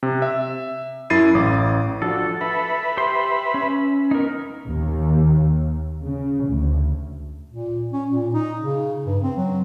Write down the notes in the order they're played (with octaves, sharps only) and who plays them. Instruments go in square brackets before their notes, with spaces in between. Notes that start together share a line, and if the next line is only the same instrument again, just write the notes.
[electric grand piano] C3
E5
F#2 E4 A6 C7 D#7
A1 D6 D#6
[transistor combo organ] F3 D4 F#4 [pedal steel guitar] A4
[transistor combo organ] B4 E5 B5
[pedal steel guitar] G4 C5 C6
C#4
[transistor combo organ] B3 [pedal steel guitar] D#4 A#4
[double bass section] D#2
C#3
D2
[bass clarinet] A#2
C#4
A#2
D#4
C#3
G2
C4
F#3